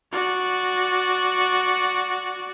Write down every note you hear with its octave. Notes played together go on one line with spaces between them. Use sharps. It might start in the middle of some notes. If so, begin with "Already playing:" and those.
F#4 D5